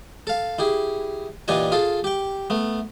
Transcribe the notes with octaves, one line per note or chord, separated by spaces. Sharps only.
A4 F5
E4 G4 G#4
A#2 E3 D4 G4 D#5 G#5
F4 G#4 A4
G4 G5
A3 B3